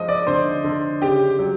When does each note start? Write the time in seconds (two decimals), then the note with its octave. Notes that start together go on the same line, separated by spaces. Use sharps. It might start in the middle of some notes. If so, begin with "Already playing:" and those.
Already playing: F3 G#3 D#5 D#6
0.08 D5 D6
0.27 D3 C5 C6
0.64 D3
1.02 C#3 G4 G5
1.39 F#3